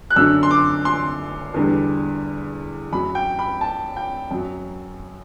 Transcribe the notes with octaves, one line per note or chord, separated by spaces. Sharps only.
F#6
F#2 D3 F#3 E6
C6
D6
C6
E2 D3 G3
F#2 F#3 B5
G5
B5
A5
G5
F#2 F#3